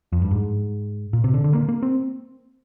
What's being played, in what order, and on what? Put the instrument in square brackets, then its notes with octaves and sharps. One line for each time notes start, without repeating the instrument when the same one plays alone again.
[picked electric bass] F2
G2
G#2
A#2
C3
D3
D3
A#3
A#3
C4